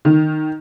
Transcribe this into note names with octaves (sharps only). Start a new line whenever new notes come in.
D#3